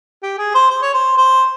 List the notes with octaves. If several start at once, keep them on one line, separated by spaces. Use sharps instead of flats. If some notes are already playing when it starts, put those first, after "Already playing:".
G4
G#4
C5
C5
C#5
C5
C5